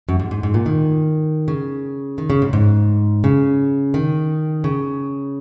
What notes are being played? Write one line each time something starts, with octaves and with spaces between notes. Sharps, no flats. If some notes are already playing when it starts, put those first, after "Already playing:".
F#2
G#2
G#2
G#2
A#2
D#3
C#3
D#3
C#3
G#2
G#2
C#3
D#3
C#3